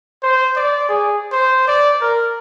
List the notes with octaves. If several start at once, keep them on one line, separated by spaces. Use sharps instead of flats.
C5
D5
G#4
C5
D5
A#4